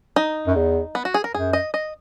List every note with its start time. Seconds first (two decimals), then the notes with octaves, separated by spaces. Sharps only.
0.16 D#4
0.47 F#2
0.56 E2
0.95 B3
1.05 F#4
1.14 G#4
1.24 A#4
1.34 F#2 G#4
1.53 D#5
1.74 D#5